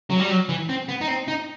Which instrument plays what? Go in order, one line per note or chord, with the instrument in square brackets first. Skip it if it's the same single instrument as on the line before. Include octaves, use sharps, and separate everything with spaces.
[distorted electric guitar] F#3
G3
F#3
E3
C4
B3
D#4
C4
D#4